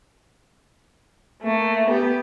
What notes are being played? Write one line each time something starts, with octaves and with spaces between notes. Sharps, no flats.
A3 A#3
B3 G4